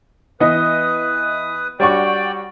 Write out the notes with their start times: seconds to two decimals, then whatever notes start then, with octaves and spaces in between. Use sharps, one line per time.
0.40 E3 B3 B4 D#5 D#6
1.80 G3 D4 F#4 C#5 D5 F#5 G5 C#6